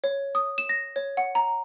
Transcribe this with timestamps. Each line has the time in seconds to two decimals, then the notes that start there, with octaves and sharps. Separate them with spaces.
0.04 C#5
0.35 D#6
0.58 E7
0.69 A#6
0.96 C#5
1.17 F#5
1.35 A#5